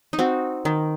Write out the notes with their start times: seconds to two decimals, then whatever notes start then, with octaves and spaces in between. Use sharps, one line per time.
0.13 D#4
0.19 C4 F#4
0.65 D#3